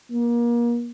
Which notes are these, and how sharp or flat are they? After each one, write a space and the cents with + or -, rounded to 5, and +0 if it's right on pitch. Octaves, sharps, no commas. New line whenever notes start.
A#3 +30